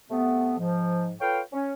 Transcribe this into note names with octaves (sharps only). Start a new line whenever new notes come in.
C3 A3 B3
G#2 F3
F4 A4 B4 C#5 F5 G5
C#4